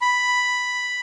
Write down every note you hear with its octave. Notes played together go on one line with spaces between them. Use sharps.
B5